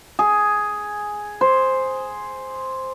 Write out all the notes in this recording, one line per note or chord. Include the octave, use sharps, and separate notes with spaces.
G#4
C5